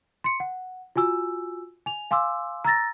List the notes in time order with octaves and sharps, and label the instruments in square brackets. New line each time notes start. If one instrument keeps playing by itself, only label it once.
[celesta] C6 C#7
F#5
F4 F#4 G#5 E6
G#5 F7
F5 G#5 C6 D6 E6
A#5 E6 A6 A#6